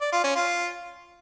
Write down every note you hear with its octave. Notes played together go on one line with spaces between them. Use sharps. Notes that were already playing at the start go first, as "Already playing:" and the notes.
D5
F4
C#4
F4